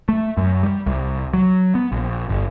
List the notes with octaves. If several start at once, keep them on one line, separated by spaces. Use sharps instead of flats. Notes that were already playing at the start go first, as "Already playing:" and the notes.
A3
F#2
G3
C2
F#3
B3
A#1
G1